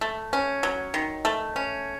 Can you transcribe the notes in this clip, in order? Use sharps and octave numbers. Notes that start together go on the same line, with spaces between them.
A3
C#4
F#3
D#3
A3
C#4